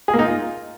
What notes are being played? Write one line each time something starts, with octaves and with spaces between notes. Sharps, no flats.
G#4
A#3
D#4
F4